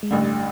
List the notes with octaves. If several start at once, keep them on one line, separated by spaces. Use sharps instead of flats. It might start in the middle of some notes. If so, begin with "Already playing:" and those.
G#3
A1 G2 D3 A3